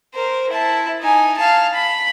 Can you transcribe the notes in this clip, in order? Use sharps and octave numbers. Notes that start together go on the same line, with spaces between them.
A#4 C5
E4 A5
D#4 G#5
F5 A5
B5